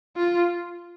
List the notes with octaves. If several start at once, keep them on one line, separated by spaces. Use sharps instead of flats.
F4